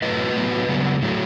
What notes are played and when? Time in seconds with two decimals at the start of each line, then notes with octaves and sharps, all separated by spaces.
0.02 A2 F#3 A3 B4 D#5
0.36 A2 F#3 B3
0.69 C#3 F#3 B3
1.02 A2 F#3 A3